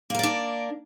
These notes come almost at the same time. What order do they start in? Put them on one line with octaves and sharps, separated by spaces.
A#3 A#4 D5 D4